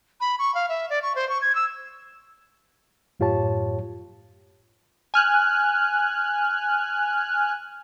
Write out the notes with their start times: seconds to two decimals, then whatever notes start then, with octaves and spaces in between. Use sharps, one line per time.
0.21 B5
0.39 C#6
0.55 F5
0.69 E5
0.90 D5
1.03 C#6
1.16 C5
1.29 C#6
1.42 G#6
1.55 E6
3.20 F#2 A2 F4 G4 C#5 A5
5.14 G#5 F6 F#6